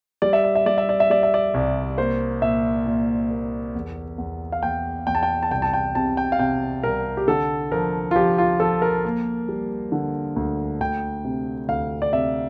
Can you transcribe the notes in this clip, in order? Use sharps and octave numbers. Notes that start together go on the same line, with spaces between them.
G3 D5
E5
D5
E5
G3 D5
E5
D5
E5
G3 D5
E5
D5
C2
A#3 C5
A#2 E5
A#2
A#3
E2
E2
F5
E2 G5
E2 G5
A5
G5
A5
C2 G5
A5
G5
C3 A5
G5
F5
C3 G5
C2 A#4
G4
D3 A4
F3 A#4
F4
F3 G4
F4
F3 A4
A#4
A#3
G3
D3
D2
D2 G5
C3
D2 F5
D5
C3 E5